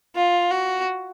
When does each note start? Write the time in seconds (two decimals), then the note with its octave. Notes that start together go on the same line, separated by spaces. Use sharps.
0.15 F4
0.51 F#4